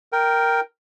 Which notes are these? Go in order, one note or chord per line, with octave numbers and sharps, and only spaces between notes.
A#4 G5